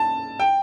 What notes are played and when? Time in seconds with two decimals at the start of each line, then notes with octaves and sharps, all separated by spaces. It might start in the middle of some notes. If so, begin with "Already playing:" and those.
Already playing: A5
0.40 G5